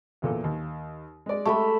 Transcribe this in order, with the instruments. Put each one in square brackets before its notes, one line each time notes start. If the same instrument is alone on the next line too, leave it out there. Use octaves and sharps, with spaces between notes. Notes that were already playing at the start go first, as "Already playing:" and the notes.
[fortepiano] E2 A#2 A4
D#2
G#3 D5
[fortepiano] G#3 G4 [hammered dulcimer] A3 E5 B5